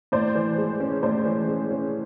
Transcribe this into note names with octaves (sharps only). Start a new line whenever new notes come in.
A2 C5 D5
E3
G#3
C#4
A2 C5 D5
E3
G#3
C#4